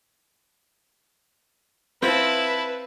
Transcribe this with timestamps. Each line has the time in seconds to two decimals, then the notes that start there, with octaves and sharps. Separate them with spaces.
2.02 C4 E4 F4 B4 A5